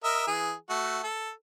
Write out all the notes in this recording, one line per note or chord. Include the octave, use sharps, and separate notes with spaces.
A#4 D#5 E5
E3 G#4
A3 F#4
A4